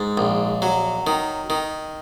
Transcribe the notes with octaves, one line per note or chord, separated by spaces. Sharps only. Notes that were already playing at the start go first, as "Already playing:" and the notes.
Already playing: G#2
A#1
F#3
D#3
D#3